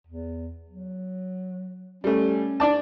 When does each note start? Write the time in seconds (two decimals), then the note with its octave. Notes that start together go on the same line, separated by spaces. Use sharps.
0.07 E2
0.70 F#3
2.04 G3 A3 C#4
2.60 D4 D5 A5